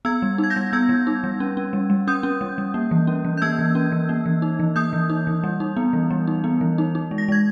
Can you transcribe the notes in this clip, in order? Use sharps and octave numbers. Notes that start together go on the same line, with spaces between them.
B3 E6 G#6
G3
D#4
G#6
G6 A#6
G3
B3 E6 G#6
G3
D#4
G3
C#4
C#4
G3
G3
C#4 D#6 G6
C#4
G3
G3
A#3
E3
C#4
E3
G6
A#3 E6 G#6
E3
C#4
E3
A#3
E3
D#4
E3
A#3 D#6 G6
E3
D#4
E3
G3
D#4
B3
E3
G3
D#4
B3
E3
D#4
D#4
G#3
A#6
G#3 G#6